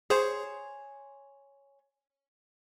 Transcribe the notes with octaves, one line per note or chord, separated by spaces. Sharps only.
G#4 C5 C#5 G#5 C6